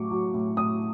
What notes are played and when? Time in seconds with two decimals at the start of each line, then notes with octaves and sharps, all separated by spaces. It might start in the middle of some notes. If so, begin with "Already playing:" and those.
Already playing: A2 F#3 C#6 D6
0.11 F#3
0.34 A2
0.57 A2 D#6